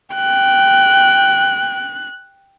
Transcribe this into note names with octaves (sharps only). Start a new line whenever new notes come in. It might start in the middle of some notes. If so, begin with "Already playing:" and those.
G5 F#6